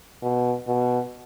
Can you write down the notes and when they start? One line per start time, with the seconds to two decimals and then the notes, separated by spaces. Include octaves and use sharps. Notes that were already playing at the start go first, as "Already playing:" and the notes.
0.22 B2
0.67 B2